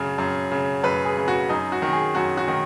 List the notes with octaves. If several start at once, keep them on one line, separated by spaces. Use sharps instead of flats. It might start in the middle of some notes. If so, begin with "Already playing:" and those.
Already playing: F#2 C#3
F#2
C#3
F#2 B4
G#4
C#3
F#4
F#2 D#4
F#4
D#3
G#4
F#2 F#4
F#4
D#3